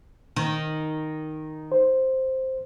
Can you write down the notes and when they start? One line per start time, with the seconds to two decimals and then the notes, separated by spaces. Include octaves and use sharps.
0.36 D#3
1.72 C5